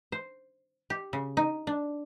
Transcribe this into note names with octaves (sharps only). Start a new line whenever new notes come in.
C5
G4
C#3
D#4
D4